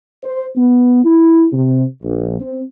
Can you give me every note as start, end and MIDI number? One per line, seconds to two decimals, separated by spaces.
0.23 0.46 72
0.56 1.03 59
1.04 1.46 64
1.51 1.82 48
2.03 2.38 34
2.40 2.62 60